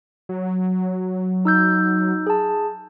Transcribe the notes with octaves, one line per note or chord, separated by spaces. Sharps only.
F#3
D#4 E6 G6
G#4 A5